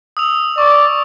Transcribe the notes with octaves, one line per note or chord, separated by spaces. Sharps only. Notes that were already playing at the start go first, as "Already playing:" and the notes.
D#6 E6 F7
D5 C#6